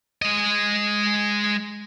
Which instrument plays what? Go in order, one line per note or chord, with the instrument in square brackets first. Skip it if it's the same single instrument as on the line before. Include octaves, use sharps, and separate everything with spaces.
[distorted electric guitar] G#3 D#5